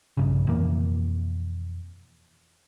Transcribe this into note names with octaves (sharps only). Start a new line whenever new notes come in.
A#1 G2 C#3
F2 B2 E3 A#3